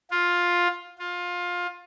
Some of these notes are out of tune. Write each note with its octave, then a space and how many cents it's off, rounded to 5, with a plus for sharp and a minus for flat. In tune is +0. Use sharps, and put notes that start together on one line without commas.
F4 +10
F4 +20